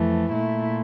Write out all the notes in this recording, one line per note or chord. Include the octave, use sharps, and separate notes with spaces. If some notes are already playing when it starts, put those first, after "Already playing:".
Already playing: F2 E3 A3
A#2 A3 E4